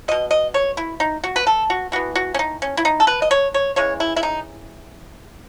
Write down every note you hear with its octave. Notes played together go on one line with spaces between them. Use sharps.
B2 A3 D#5
D#5
C#5
E4
D#4
F#4
B4
A4
F#4
E3 B3 F#4
F#4
C#4
D#4
C#4
E4
D#4
A4
B4
D#5
C#5
C#5
C#3 E3 G#3 C#5
E4
E4
D#4